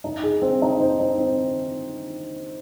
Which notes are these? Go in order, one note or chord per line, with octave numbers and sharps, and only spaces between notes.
D#4
G#4
C4
D#4
C5
D#4
C4